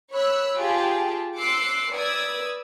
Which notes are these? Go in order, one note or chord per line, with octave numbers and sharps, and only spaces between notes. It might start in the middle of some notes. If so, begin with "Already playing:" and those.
C#5 B5 E6 F#6
F4 G4 G#4 G5 A5
C6 D6 E6 F#6 C7 C#7
B4 D5 D#6 E6 G#6